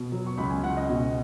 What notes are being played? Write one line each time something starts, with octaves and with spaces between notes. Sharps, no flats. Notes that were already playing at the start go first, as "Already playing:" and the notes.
Already playing: B2
F#3
C#6
C#2 B5
G#5
C#2 F#5
D#5
B2